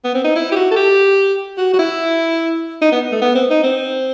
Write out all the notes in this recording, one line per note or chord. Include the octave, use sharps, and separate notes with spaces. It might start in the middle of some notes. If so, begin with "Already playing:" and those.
B3
C4
D#4
E4
G4
F#4
A4
G4
F#4
F#4
E4
D#4
B3
A3
B3
C4
D#4
C4